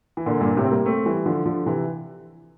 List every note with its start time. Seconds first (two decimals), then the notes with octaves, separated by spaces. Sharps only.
0.17 E3
0.26 A#2 D3
0.41 G2 A#2
0.57 A2 C3
0.64 C4
0.71 G3 A#3
0.86 A3 C4
1.06 E3 G3
1.26 D3 F3
1.46 D3 F3
1.66 C3 E3